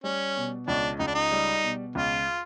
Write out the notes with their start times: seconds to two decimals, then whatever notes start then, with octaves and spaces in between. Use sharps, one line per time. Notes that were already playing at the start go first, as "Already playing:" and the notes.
0.04 G3 C#4
0.36 B2
0.67 C#2 D4
0.99 C#2 D#4
1.07 D4
1.15 D#4
1.32 G3
1.63 B2
1.95 C#2 F4